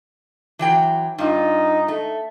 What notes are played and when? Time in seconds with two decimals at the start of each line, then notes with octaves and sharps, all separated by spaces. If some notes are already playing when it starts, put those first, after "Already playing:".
0.59 E3 F#3 G5
1.18 G2 D#4 F4
1.88 A3